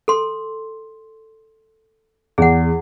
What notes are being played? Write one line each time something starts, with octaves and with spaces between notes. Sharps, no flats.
A4 C6
E2 G#4 F#5